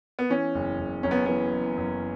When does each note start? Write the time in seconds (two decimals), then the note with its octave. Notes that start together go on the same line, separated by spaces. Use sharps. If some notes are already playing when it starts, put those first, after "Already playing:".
0.19 B3
0.30 E3 C#4
0.55 F#1
0.79 F#1
1.03 F#2 C#4
1.11 B3
1.26 E3 B3
1.52 F#1
1.77 F#2